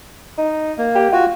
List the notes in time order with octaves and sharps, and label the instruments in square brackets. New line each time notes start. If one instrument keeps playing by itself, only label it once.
[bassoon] D#4
[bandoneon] A#3
[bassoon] G4
[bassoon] F4 [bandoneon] F#4